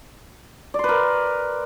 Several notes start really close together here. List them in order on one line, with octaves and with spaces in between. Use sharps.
D5 C6 B4 A#4